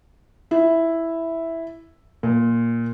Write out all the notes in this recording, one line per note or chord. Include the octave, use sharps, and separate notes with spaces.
E4
A#2